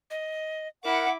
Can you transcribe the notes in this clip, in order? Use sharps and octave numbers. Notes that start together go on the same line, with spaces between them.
D#5
E4 A#4 F#5 D6